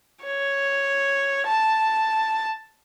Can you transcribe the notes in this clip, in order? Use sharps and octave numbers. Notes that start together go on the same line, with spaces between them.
C#5
A5